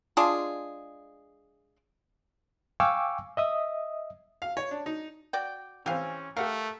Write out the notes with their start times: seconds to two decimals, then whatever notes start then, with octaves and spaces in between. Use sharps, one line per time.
0.17 G#3 D4 F4 G#4
2.80 F5 G5 G#5 C#6 D6 E6
3.37 D#5 E5 D#6
4.42 F5
4.57 C#5
4.71 D4
4.86 D#4
5.33 F#4 D5 G5
5.86 E3 C4 C#4 G4 F5
6.37 A3 G4 A#4 F5 F#5